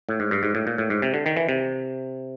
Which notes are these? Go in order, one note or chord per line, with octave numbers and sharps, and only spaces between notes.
A2
G#2
G2
G#2
A2
A#2
A2
G#2
C3
D3
D#3
E3
C3